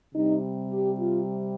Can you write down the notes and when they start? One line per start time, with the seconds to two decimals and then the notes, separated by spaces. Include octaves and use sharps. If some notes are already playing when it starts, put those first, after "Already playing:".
0.14 C3 G3 D#4
0.71 G4
0.99 F4